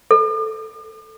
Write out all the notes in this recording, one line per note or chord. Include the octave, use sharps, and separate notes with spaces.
A4